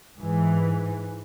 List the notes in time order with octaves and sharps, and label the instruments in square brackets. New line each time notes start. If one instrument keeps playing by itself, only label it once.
[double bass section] G#2 E3